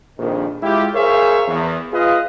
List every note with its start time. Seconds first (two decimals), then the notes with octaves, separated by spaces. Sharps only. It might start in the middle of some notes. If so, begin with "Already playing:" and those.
0.18 A#1 F2 D#3
0.63 G#3 E4 F4 G4
0.94 G#4 A#4 C5 C#5 E5 F5
1.48 E2
1.92 F4 G#4 B4 D#5 F5